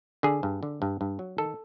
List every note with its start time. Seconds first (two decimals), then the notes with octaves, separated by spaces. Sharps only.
0.23 D3 G#4
0.43 G2
0.63 D3
0.82 G2
1.01 G2
1.19 F#3
1.38 D#3 A4